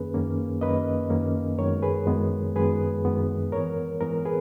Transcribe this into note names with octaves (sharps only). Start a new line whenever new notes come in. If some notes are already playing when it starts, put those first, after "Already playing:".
Already playing: F#2 D#3 A#3 C#4 G#4 B4
F#2 D#3 A#3 C#4
F#2 D#3 A#3 C#4 B4 D#5
F#2 D#3 A#3 C#4
F#2 D#3 G#3 B3 A#4 C#5
G#4 B4
F#2 D#3 G#3 B3
F#2 D#3 G#3 B3 G#4 B4
F#2 D#3 G#3 B3
G#2 E3 B3 A#4 C#5
G#2 E3 B3 A#4
G#4 B4